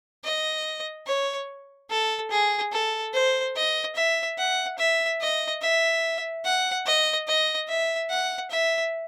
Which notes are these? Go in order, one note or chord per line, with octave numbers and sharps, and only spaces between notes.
D#5
C#5
A4
G#4
A4
C5
D#5
E5
F#5
E5
D#5
E5
F#5
D#5
D#5
E5
F#5
E5